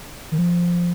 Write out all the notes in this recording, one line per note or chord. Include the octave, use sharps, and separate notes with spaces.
D#3
F3